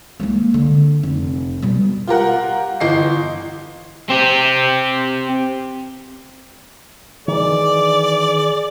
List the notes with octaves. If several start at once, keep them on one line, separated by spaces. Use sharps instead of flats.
G#3 A#3
D3
F1
B2 G3
F4 G4 A#4 F#5
G1 E3 D#5 C7
C4 G4
D#3 E3 G#4 D5